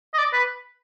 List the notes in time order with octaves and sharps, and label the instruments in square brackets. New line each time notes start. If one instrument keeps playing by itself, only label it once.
[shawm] D#5
D5
B4